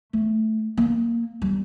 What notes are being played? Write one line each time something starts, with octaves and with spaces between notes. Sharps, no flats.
A3
A#3
G3